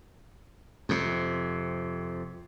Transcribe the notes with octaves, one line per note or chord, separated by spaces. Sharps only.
F2 C3